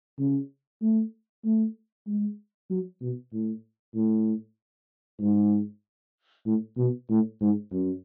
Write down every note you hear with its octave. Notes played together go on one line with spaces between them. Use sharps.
C#3
A3
A3
G#3
F#3
B2
A2
A2
G#2
A2
B2
A2
G#2
F#2